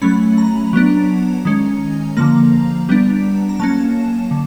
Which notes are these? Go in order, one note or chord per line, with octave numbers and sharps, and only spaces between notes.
F#3 A3 C#4 B5
A#5
F#3 B3 D4
D#3 G#3 C#4
D3 F3 A#3 A#5
G3 B3 D4
A#5
F#3 A#3 C#4 A5
D3